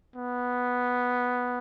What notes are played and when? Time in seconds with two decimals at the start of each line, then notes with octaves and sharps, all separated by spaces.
0.16 B3